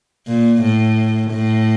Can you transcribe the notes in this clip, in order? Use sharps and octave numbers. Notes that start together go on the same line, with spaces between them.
A#2
A2
A2